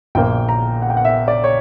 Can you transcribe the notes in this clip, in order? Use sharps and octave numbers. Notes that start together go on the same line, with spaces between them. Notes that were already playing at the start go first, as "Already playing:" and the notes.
A#1 A#2 A#3 G5
A#5
F#5
G5
F#5
E5
D5
C#5